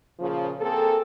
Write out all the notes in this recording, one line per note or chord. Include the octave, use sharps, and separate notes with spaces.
A#2 C#3 F3
A#3 C4 G#4 A4